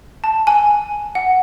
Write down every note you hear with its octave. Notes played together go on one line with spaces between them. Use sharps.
A5
G#5
F#5